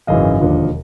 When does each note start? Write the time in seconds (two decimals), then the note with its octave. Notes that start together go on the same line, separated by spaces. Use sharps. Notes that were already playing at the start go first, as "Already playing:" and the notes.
0.07 G#1 F#2 C#3 E3 D#5 F5
0.40 E1 D#2 D3 F3